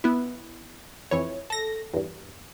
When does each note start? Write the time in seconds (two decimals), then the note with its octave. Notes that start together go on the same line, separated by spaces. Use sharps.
0.04 B3 E4
1.11 F2 E3 C#5
1.50 A4 A#6
1.93 E2 G2